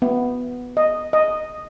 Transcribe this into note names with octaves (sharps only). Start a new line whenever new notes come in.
B3
D#5
D#5